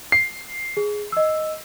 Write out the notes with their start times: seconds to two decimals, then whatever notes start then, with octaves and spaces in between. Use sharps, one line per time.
0.12 C7
0.77 G#4
1.12 D#5 E6